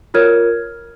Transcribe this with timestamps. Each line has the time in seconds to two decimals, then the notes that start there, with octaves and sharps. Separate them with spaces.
0.14 F4 A#4 C#5 F6 G#6